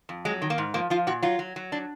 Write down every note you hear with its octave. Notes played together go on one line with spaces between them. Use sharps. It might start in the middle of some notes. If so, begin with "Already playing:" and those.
F2
F#3 G#3
D#3
A#3
G#2
F3 A#3
F3 F4
A#2 F#4
F#3 F4
F#3
F#3
D4